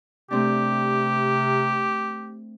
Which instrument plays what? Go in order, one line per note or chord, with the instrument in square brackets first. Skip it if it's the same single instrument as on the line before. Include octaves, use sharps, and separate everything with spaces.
[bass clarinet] C3 [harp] A3 C4 D4 [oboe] G4